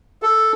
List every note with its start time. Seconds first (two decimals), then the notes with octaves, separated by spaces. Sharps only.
0.22 A4